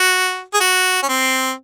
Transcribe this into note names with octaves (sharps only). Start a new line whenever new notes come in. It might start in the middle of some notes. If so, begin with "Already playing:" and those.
Already playing: F#4
G#4
F#4
C#4
C4